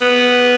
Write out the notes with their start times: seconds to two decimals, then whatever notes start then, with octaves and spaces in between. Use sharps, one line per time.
0.01 B3